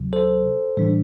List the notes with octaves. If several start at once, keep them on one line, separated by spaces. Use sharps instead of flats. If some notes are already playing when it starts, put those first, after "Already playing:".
Already playing: D2 C3 F#3
A4 C5
A2 E3 G3 D4